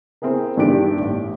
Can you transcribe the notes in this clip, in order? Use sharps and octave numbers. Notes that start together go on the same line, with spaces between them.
C4 E4 G#4 A#4
G2 D3 D#3 D4 G4 D7
A1